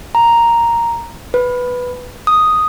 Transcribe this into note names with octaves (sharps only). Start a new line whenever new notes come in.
A#5
B4
D#6